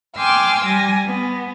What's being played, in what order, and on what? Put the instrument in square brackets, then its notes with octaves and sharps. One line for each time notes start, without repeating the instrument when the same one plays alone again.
[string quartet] G5 G#5 C6 D6 E6 F6
G3 G#5 A#6
B3